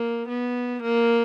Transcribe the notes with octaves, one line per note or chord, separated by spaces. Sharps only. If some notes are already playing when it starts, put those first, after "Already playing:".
Already playing: A#3
B3
A#3